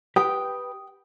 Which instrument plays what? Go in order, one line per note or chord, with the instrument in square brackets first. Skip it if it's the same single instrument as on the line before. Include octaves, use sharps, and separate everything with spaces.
[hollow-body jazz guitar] G4 B4 [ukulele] G5 [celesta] D#6